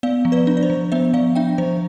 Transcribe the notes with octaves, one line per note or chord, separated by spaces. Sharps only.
B3 D5 F5
F3
B4 D5
D4
D5
C5
F3
B3 C5 E5
F3 D5 F5
D4 E5 G5
F3 C5